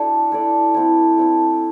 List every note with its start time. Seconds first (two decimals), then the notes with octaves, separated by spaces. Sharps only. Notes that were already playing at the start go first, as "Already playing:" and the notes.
Already playing: D4 E4 F#4 A4 D5
0.32 E4 A4 D5
0.74 A3 C4 E4
1.18 A3 C4 E4